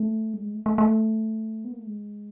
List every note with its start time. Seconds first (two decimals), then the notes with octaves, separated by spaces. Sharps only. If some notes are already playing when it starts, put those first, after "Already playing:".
Already playing: A3
0.34 G3
0.42 G#3
0.54 A3
0.66 A3
0.78 A3
1.65 B3
1.72 A#3
1.79 A3
1.87 G#3